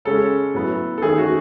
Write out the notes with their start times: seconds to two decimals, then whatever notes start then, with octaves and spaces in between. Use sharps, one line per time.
0.05 C#3 G#3 C#4 A4
0.54 A2 F#3 B3
0.98 A4
1.02 D#3 A3 C#4 G#4
1.18 F#4